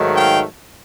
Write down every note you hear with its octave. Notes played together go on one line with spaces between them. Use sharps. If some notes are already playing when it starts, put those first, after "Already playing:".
Already playing: G#2 D#3 F#3 A3
F5 G5